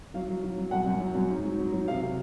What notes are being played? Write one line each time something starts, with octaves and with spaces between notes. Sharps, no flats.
F#3 F5
F#3
F#3
F#3
F#2 F#5
F#2
F#3
F#2
G#2
F#3
F#3
F#3
C3 F5
C3